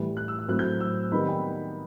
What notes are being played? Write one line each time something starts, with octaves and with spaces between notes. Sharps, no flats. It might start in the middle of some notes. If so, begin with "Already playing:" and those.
Already playing: A2 E3 G3
F#6
E6
E6
A2 F#3 C4 F#6
G6
E6
D#3 G3 B3 D#4 B5
G5